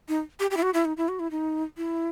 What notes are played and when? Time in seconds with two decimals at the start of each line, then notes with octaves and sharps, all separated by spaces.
0.08 D#4
0.40 G4
0.51 G4
0.57 E4
0.62 F#4
0.74 E4
0.85 D#4
0.97 E4
1.08 F#4
1.19 E4
1.31 D#4
1.77 E4